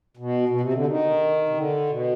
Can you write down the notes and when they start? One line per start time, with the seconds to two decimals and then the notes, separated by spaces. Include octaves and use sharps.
0.17 B2
0.49 B2
0.61 C3
0.73 D3
0.86 D#3
1.49 C3
1.55 D3
1.90 B2